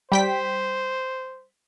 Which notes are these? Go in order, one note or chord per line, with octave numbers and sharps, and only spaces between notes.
G3 C5 G5 B6